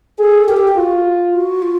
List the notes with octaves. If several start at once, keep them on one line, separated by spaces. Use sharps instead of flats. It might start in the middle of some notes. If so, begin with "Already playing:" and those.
G#4 A4
G4 A#4
A4
G4
F4 F#4
F#4
F4